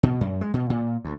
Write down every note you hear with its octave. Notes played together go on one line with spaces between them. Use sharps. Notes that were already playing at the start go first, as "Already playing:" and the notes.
B2
F#2
G#3
B2
A#2
D2